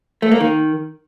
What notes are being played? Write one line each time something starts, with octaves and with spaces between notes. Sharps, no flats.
A3
A#3
D#3